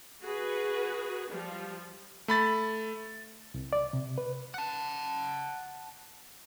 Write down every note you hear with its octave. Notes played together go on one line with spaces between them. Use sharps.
F#4 G#4 B4
F3 G3
A3 B5 A6
C2
D5
C3
B4
F#5 A5